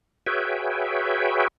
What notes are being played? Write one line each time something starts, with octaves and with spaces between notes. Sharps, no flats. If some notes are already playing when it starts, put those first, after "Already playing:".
F#4 G#4 B4 C#5 E5 G5